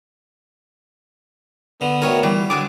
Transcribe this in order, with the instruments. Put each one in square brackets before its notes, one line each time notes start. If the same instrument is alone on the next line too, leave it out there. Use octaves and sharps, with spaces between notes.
[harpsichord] D3 [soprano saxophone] B3
[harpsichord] D2 D#3 G#5 [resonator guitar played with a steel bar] A#4 C#5
[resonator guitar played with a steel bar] E3 [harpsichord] G3
[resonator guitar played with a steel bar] D3 F#3 G#3 [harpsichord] G#5 [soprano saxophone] D6